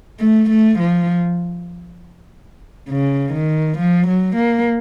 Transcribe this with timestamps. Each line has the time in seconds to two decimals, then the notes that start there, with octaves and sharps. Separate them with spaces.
0.21 A3
0.50 A3
0.80 F3
2.89 C#3
3.33 D#3
3.79 F3
4.09 F#3
4.37 A#3